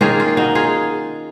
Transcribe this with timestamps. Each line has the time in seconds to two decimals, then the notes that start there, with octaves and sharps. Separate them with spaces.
0.01 D#3 A#3 C#4 F4 G#4
0.20 F4
0.37 D#4 F#4
0.55 F4 G#4